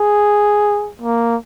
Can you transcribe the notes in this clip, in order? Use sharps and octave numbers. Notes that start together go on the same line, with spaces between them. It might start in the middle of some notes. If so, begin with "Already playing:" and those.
Already playing: G#4
A#3